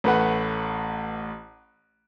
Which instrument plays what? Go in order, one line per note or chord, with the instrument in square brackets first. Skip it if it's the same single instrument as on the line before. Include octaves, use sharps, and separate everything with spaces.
[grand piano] A1 A3 B4 F#5